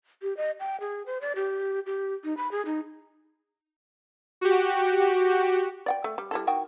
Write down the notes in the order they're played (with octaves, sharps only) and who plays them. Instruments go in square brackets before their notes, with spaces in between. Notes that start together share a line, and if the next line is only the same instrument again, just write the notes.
[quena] G4
D#5
G5
G#4
C5
D5
G4
G4
D#4
B5
G#4
D#4
[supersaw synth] F#4 G4
[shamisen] D5 F#5 G5
A3
G3
G3 E4 A4
D#3 F#4 G5